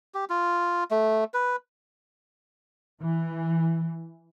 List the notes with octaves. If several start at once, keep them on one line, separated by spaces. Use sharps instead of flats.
G4
F4
A3
B4
E3